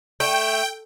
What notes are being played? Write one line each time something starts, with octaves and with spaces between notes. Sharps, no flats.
A3 G5